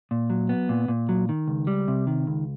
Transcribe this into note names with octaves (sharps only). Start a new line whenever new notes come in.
A#2
F#3
B3
A#2
A#2
F#3
D#3
C#2
G3
C3
D#3
C#2